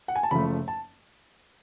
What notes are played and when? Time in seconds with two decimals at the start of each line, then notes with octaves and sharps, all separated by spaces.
0.08 F#5
0.15 G#5
0.23 A5
0.31 F#1 F#2 F3 A3 B5
0.68 A5